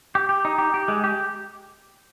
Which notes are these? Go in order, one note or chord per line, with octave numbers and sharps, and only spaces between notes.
G4
G4
D#4
G4
G4
G#3
G4